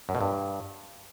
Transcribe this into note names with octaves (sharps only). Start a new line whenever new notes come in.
F#2
B2
G2